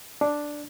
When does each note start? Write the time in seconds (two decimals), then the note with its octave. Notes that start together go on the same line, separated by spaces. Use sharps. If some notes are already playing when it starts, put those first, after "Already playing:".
0.21 D4